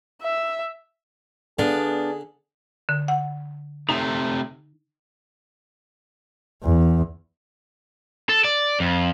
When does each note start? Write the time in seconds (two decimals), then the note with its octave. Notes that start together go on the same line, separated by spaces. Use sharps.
0.22 E5
1.59 D3 B3 D4 G#4 F5
2.89 D3
3.08 F#5
3.89 C3 A3 D#4 A#5
6.64 E2
8.29 A4
8.44 D5
8.80 F2